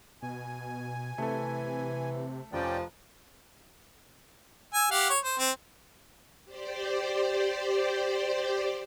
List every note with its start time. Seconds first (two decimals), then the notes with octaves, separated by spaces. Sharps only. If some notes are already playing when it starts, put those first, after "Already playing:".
0.22 B2 G#5
1.18 C3 E3 A3 A4
2.53 F1 F3 C#4 D5 G5
4.74 G#5 E6
4.91 G4 F5 F#5
5.10 C#5
5.25 C5
5.39 C4
6.45 G4 C5 D5